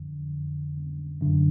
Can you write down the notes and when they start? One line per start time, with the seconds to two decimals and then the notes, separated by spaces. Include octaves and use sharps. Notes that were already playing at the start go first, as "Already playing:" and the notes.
Already playing: F2 D3
1.21 F#2 D3